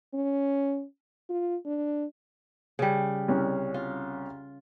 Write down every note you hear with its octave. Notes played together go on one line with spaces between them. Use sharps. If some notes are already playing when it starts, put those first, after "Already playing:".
C#4
F4
D4
C#3 G3
C2 C#4
F4